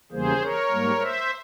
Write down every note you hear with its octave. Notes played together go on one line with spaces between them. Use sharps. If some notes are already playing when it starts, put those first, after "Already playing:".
E2 C#3 E3 G3 A#3 G#4 C5
A#4 C#5
G#2 G3 A#3
C5 E5